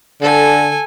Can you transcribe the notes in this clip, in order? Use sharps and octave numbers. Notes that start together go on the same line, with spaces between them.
D3 A4 G#5